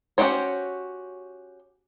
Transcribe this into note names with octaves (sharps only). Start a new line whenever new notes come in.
C#4 F#4 G4 C5 C#5